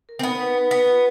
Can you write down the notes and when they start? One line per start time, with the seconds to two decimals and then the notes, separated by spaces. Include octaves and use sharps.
0.09 A#4
0.19 C4
0.23 B3 D#4
0.40 B4
0.55 B4
0.71 B3 B4
0.88 F4